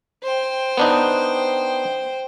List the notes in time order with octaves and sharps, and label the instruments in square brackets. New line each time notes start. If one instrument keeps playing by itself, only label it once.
[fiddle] C5 G5
[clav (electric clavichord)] B3 D4 D#4